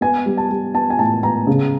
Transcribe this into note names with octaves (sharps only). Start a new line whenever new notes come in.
B3 G#5
G3
A5
G3
B3 A5
G#5
A2 A5
B3 A#5
C#3